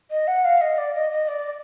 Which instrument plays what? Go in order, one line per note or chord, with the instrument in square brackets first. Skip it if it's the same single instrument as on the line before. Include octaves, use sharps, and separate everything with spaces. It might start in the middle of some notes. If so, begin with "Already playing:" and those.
[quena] D#5
F#5
F5
D#5
D5
D#5
D#5
D5
D5